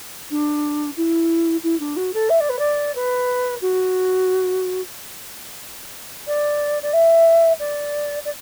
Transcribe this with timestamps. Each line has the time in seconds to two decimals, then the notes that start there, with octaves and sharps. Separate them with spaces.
0.31 D4
0.97 E4
1.63 E4
1.80 D4
1.97 F#4
2.14 A4
2.30 E5
2.40 D5
2.50 B4
2.59 D5
2.95 B4
3.62 F#4
6.27 D5
6.83 D5
6.93 E5
7.60 D5
8.25 D5